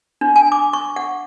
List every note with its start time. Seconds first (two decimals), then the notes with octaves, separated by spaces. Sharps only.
0.21 D4
0.36 G#5
0.52 D6
0.73 C#6
0.96 F#5